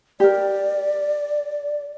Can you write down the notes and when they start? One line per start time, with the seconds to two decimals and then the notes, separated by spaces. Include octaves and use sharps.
0.20 G4 A#4 D5